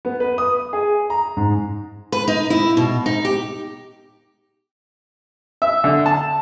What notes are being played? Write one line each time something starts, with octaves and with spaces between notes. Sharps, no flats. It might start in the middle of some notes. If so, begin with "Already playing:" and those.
B3
B4
D#6
G#4
A#5
G#2
B4
D#4
E4
B2
D#4
G4
E5
D3
A5